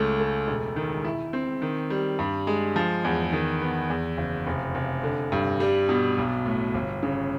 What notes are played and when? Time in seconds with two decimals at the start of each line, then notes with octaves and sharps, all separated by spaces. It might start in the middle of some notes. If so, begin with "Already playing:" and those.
Already playing: C#2 A3
0.20 A3
0.48 E1
0.76 D#3
1.04 E4
1.33 C4
1.62 D#3
1.90 G3
2.19 G2
2.47 G#3
2.76 F3
3.04 E2
3.33 D#3
3.61 B3
3.90 E2
4.18 F#1
4.47 F1
4.75 F1
5.03 D3
5.32 G2
5.60 G3
5.89 B2
6.18 B1
6.46 A2
6.74 G1
7.03 C#3